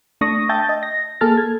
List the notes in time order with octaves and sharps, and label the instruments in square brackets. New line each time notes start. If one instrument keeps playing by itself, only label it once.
[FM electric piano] A3 D4 C#6 D#6 A#6
E5 G5 A5 G6 A6
D#5
A#6
A#3 G#4 A4 F6 A6
G#6